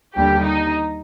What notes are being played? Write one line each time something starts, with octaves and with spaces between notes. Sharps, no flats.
D#2 D3 G3 A#3 G4
D#4